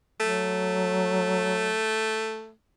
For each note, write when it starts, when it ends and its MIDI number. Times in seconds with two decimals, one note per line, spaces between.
0.20 1.80 54
0.20 2.52 57